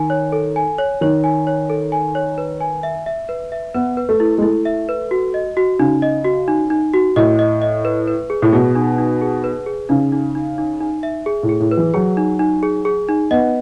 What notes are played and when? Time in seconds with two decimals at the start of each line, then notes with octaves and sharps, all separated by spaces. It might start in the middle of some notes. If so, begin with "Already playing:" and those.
Already playing: D#3 G#5
0.10 C#5
0.32 A4
0.56 G#5
0.78 C#5
1.01 D#3 C#5
1.24 G#5
1.47 C#5
1.70 A4
1.92 G#5
2.15 C#5
2.38 B4
2.61 G#5
2.83 E5
3.06 E5
3.29 B4
3.52 E5
3.74 B3 B4
3.97 B4
4.09 A3
4.20 E4
4.38 G#3
4.42 A3 E4
4.65 E5
4.89 B4
5.11 F#4
5.34 D#5
5.57 F#4
5.79 C#3 D#4
6.02 D#5
6.24 F#4
6.48 D#4
6.70 D#4
6.93 F#4
7.16 A2 D#5
7.39 D#5
7.62 D#5
7.85 B4
8.08 B4
8.30 G#4
8.42 A2
8.53 B2 G#4
8.75 D#4
8.98 D#4
9.21 G#4
9.44 B4
9.66 G#4
9.89 C#3 D#4
10.12 D#4
10.35 D#4
10.58 D#4
10.80 D#4
11.03 E5
11.26 G#4
11.43 A2
11.49 G#4
11.60 A2
11.71 B4
11.77 E3
11.94 F#3 G#4
12.17 D#4
12.39 D#4
12.63 G#4
12.85 G#4
13.09 D#4
13.31 B3 D#5